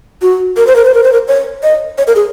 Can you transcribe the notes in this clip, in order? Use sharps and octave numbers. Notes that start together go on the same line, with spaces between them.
F#4
A#4
C5
A#4
C5
A#4
C5
A#4
C#5
D#5
C#5
A#4
G#4